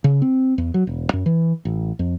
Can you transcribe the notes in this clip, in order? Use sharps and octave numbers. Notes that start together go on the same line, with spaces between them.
C#3
C4
E2
F#3
E1
F#2
E3
A1
F2